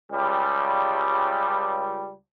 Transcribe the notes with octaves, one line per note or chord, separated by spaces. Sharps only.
C#2 G3